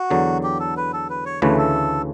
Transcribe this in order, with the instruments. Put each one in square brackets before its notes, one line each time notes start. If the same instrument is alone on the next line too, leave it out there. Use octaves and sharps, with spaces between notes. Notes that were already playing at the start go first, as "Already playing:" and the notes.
Already playing: [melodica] F#4
[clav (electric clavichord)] E2 D3 F#3
[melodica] G4
A4
B4
A4
B4
C#5
[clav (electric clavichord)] D2 C#3 E3 A3 [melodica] B4
[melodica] A4